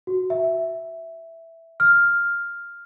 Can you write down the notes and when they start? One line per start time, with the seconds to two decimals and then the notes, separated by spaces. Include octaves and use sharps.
0.07 F#4
0.30 E5
1.80 F6